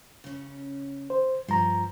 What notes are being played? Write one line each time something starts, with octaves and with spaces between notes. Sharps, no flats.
C#3 C#4
C5
G2 F3 A#5